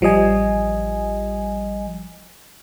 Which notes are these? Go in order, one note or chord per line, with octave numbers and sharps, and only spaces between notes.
A1 F3 G3 D#5 G#5